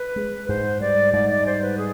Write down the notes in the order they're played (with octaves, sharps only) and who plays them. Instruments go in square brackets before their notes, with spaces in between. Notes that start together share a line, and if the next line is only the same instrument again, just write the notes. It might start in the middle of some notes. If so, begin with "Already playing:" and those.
Already playing: [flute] B4
[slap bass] G#3
[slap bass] G#2 [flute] C5
[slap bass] G3 [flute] D5
[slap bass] G#2 [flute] D5
[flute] D5
[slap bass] G3 [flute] C5
[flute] B4
G#4